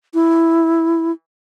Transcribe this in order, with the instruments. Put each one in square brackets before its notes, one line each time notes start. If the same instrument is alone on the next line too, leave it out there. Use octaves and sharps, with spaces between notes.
[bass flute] E4